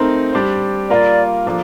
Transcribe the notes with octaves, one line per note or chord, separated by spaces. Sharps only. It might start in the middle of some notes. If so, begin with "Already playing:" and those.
Already playing: A3 C4 D#4 A#4
G3 D4 G4 C5
G3 A#3 F4 A#4 D5
F3 A#3 D4 A4